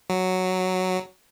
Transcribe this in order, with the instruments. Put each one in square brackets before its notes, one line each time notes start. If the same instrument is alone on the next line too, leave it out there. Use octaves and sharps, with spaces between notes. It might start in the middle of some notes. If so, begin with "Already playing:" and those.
[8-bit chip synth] F#3